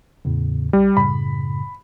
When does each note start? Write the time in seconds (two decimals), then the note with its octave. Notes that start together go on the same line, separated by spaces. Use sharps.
0.25 E2 A2 C#3
0.73 A#1 G3
0.97 F#2 A2 C#3 B5